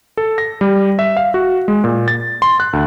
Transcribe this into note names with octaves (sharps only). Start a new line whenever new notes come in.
A4
A#6
G3
E5
F5
F#4
G#3
A#2
A6
C6
F#6
D2